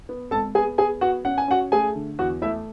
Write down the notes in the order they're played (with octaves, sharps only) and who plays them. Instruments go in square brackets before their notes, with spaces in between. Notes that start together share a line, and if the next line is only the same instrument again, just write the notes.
[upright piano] B3
G#1 A4 A5
B3 G#4 G#5
B3 G#4 G#5
B3 F#4 F#5
C#4 F#5
G#5
C#4 F#4 F#5
A3 G#4 G#5
D3
E2 F#4 F#5
A3 E4 E5